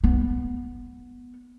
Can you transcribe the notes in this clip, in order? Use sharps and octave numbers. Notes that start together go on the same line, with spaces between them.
B3